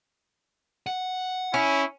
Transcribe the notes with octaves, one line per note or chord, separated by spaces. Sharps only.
F#5
C#4 E4